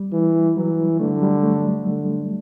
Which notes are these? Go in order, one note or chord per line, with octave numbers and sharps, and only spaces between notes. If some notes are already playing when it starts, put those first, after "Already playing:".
Already playing: G3
E3
E3 F#3
D3 A3
G3
F#3
G3
A3
D3